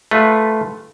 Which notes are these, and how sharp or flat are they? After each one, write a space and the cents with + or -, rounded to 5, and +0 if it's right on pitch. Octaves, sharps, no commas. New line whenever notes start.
A3 -5 F4 +0 B4 +0